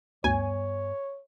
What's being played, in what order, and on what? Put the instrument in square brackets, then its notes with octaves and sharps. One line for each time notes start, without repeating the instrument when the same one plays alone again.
[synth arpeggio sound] D2 [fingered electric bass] G2 B3 [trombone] C#5 [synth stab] G#5